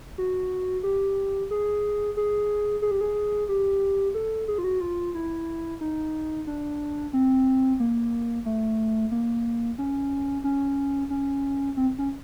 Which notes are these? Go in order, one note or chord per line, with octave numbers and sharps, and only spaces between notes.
F#4
G4
G#4
G#4
G#4
G4
G#4
G4
A4
G#4
F4
F#4
F4
E4
D#4
D4
C4
A#3
A3
A#3
C#4
C#4
C#4
C4
C#4